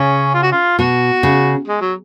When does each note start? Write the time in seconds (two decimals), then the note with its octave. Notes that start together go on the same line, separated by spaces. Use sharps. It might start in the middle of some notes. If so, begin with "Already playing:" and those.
Already playing: C#3 C#4
0.34 F4
0.43 F#4
0.52 F4
0.79 B2 F#4
1.23 C#3
1.68 G#3
1.81 F#3